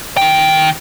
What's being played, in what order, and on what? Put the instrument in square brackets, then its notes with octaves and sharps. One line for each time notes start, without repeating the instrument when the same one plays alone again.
[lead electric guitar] D#3 G5